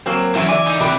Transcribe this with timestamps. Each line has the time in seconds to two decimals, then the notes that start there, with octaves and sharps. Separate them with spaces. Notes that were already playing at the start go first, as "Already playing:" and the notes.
0.06 F#3 A#3 C4
0.35 D3 E3 F#3 C#4
0.49 E3 D5 E5 G#5
0.67 D3 D#4
0.80 C3 D4 G4 B4